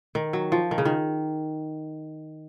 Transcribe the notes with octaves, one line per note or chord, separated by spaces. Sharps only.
D#3
F#3
F3
D#3
C#3
D#3